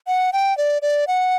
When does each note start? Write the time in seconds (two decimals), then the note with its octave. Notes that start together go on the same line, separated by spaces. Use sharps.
0.07 F#5
0.33 G5
0.58 D5
0.82 D5
1.08 F#5